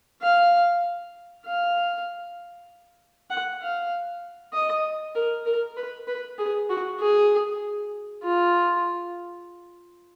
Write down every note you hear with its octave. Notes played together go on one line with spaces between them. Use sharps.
F5
F5
F#5
F5
D#5
A#4
A#4
B4
B4
G#4
F#4
G#4
F4